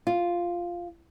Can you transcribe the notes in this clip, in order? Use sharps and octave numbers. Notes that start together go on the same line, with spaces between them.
F4